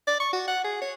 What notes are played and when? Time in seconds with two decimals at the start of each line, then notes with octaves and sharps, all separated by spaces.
0.07 D5
0.20 C#6
0.33 F#4
0.48 F#5
0.64 G#4
0.82 C#5